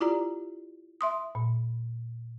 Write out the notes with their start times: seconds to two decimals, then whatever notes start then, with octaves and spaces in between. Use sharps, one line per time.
0.01 E4 F4 G4 D5 A#5
1.01 E5 C6 D#6
1.35 A#2